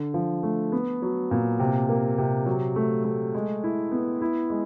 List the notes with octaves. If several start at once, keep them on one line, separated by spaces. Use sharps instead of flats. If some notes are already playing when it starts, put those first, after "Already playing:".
Already playing: D3
F3
A3
B3
F#3
A#2
C3
A#3
C3
F#3
A3
A3
G#3
E4
B3
E4
G#3